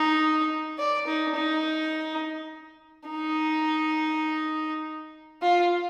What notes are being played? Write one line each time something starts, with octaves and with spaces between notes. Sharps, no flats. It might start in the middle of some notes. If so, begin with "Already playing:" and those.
Already playing: D#4
D5
D#4
D#4
D#4
F4